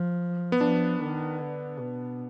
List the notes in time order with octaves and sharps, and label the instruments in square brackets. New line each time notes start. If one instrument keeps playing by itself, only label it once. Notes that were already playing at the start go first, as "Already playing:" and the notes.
Already playing: [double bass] F3
[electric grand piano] B3
[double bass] F3 [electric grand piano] D4
[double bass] D#3
D3
B2